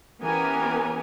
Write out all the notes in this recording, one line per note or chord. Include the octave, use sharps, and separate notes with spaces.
E3 B3 C#4 G4 A#4 G#5